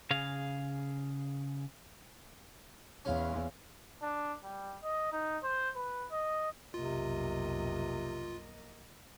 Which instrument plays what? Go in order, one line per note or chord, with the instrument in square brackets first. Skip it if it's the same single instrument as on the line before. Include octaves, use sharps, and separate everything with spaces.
[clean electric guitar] C#3 G#4 F5
[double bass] E2 [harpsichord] C#4 F4
[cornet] D4
G3
D#5
D#4
C5
B4
D#5
[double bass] B1 F2 [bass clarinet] C3 [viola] A#3 D#5 [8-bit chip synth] F4